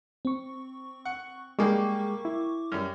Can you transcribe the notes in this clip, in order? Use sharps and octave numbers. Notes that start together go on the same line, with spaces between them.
C4 C#6
F#5
G3 G#3 A#3 D4 G#4 G5 C#6 D6
E4
F#2 G3 F6